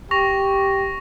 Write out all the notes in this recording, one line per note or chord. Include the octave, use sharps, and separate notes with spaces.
G4 C#6 A#6 F7